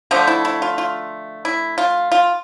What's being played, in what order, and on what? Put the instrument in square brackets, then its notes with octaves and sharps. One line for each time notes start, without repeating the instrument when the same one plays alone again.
[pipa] D3 F3 A3 C5
E4
E4
F4
F4
E4
F4
F4